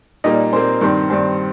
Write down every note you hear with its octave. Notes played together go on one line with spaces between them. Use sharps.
A#2 G3 A#3 D#4 D#5
A#2 G3 A#3 C4 C5
G2 D#3 G3 C4
G2 D#3 G3 C4